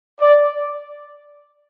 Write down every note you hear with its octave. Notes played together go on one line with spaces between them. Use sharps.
D5